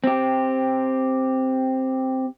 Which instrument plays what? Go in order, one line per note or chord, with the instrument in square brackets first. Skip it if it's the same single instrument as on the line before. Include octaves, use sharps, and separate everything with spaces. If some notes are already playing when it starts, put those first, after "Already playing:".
[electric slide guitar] C4 G4